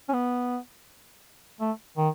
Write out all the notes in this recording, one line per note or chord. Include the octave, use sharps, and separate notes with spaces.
C#4
B3
A3
D#3